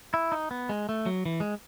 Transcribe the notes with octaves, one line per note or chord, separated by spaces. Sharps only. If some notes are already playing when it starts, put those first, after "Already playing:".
E4
D#4
B3
G#3
A3
F#3
E3
G#3